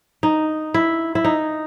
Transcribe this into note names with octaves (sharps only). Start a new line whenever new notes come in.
D#4
E4
E4
D#4